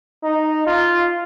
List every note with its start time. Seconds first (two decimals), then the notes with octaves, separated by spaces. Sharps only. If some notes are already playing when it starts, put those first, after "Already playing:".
0.23 D#4
0.67 F4